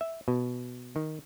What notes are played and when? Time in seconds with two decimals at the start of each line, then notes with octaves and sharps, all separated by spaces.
0.01 E5
0.28 B2
0.96 D#3